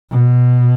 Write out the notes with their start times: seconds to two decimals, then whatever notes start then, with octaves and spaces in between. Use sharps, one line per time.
0.12 B2